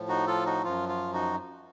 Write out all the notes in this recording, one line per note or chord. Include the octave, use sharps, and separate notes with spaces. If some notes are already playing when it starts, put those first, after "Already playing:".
Already playing: A2 F3
D#4 F#4
F4 A4
D#4 F#4
F#2 F3 F4
F4
D#4 F#4